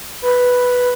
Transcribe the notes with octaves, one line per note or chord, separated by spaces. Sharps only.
B4